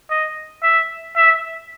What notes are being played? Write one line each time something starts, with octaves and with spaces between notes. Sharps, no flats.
D#5
E5
E5